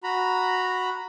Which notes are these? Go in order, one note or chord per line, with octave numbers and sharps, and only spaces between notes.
F#4 A#5 B5